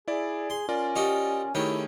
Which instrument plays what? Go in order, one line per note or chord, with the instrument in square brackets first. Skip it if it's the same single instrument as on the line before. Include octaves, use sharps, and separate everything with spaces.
[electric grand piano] E4 D5 [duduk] G#4
[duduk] G#4 [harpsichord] C6
[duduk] C#4 [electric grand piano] F4 A#4 D5
[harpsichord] D#4 F#4 G4
[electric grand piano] D#3 A3 G#4 [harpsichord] C#4 G4 [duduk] E4